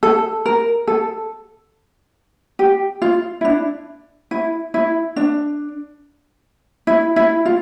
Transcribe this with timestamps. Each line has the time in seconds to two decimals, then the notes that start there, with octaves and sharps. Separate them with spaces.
0.03 A4
0.46 A#4
0.87 A4
2.59 G4
3.02 F4
3.41 E4
3.45 D4
4.31 E4
4.74 E4
5.16 D4
6.87 E4
7.16 E4
7.46 F4